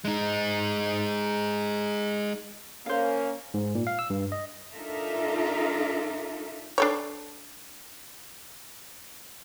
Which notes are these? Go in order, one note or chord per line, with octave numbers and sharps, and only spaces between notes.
G#3 D#4
A#3 C#4 A#4 C5 F5
G#2
A#2
F5
E6
G2
D#5
D4 D#4 F4 A4 A#4 E5
D4 A4 C#5